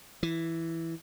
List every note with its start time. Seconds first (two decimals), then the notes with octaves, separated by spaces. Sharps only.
0.23 E3